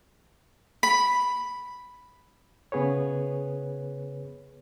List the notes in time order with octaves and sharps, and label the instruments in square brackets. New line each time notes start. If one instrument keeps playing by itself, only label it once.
[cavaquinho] B5
[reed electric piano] C#3 B3 G#4 B4 C#5